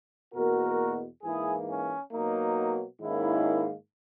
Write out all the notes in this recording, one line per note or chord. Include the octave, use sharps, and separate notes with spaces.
E2 B2 A#3 F#4 A#4
G#2 E3 A#3 E4 G#4
C#4
B2 F#3 A#3 D#4
G#2 D#3 A#3 C#4 E4